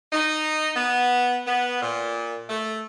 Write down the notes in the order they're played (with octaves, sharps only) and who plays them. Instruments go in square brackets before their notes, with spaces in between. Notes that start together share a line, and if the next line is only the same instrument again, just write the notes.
[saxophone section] D#4
B3
B3
A#2
A3